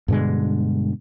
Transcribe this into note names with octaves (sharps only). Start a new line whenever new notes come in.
G2 B2 D3 G#3